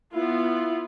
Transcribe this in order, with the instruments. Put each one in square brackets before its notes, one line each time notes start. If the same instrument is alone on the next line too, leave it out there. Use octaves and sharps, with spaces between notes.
[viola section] B3 F4 [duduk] E4